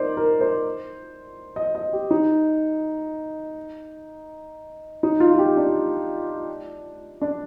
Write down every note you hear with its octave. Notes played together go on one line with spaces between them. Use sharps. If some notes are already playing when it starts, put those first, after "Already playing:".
Already playing: D#4 A#4 C5 D5
A#4
C5
D#5
D#5
G4
D#4
D#4
F4
F4
G4
D4
D4